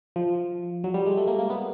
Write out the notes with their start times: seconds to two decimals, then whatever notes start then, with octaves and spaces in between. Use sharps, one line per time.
0.16 F3
0.84 F#3
0.94 G3
1.06 G#3
1.17 A3
1.28 A#3
1.39 A#3
1.50 B3